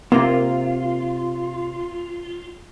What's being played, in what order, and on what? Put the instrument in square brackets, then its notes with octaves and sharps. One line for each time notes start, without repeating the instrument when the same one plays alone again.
[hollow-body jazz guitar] C3 C4 [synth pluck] A#3 [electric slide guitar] F4